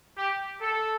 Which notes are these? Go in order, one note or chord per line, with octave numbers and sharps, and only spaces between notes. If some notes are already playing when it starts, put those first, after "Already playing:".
G4
A4